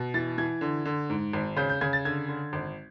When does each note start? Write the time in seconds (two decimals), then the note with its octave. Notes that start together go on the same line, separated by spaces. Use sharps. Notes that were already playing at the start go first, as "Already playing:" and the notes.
Already playing: B2
0.14 E3 A6
0.38 E3 G#6
0.61 D3
0.85 D3
1.10 G#2
1.33 G#1
1.57 C#3 G6
1.69 G6
1.81 C#3 G#6
1.93 A6
2.05 D3 G#6
2.28 D3
2.53 G#1